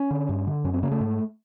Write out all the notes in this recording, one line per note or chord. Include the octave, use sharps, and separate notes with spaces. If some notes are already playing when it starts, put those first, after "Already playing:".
Already playing: C#4
D3
G2
D3
F#2 C#4
C4
C#3 A#3
A3
G#2